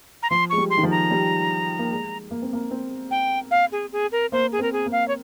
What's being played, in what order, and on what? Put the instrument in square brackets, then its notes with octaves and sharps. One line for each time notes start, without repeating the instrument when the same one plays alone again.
[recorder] A#5
[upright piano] F3 [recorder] C6
[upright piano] G#3 [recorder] C#6
[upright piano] G3
[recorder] C6
[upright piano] D#3
F3
[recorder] A#5
[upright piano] G3
A#3
G#3
A#3
C4
A#3
C4
[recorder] G5
F5
G#4
G#4
A#4
[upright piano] A#3 [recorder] C5
[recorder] G#4
[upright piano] C4 [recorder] A#4
[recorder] G#4
[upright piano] A#3
[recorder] F5
C#5